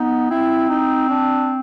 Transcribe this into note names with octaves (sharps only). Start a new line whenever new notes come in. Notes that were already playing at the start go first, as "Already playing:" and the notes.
Already playing: B3 D#4
C4 E4
D#4
D4